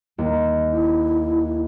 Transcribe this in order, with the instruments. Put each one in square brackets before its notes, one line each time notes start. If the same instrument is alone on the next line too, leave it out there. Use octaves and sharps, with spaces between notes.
[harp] D#2
[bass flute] E4